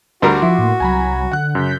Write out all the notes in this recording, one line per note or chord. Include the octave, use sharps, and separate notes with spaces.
D2 G3 F#4 A#4 C6 D6
F3 E4
A2 A#3 F#5
C2 F#3 G#5 A#5 B5
D3 F#5 F#6
F#2 C#3 G6 B6